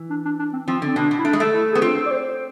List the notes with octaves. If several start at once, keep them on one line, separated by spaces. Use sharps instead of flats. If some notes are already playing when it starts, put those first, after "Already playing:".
Already playing: E3
D4
D4
D4
C4
F3 C4
D3
C4
B2 D4
B2
E4
A3 D4
G#3
A3
E4
B3 G#4
C4 F4
A4
D5
C5
C5